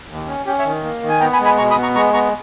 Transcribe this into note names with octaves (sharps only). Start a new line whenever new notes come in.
D#2
C#4
C#4 G4
C#5 E5
D#3
A#3
D#3
G#5
B3 G5 A#5
G#5 B5
G#3
G#5 B5
B2 A#5 C#6
B5 D#6
B3
A#5 C#6
G#3 A#5 C#6
B3 A#5 C#6